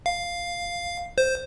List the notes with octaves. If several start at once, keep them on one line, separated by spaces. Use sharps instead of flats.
F5
C5